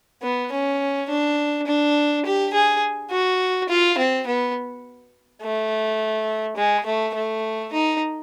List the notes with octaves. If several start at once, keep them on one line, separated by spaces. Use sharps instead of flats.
B3
C#4
D4
D4
G4
G#4
F#4
F4
C4
B3
A3
G#3
A3
A3
D#4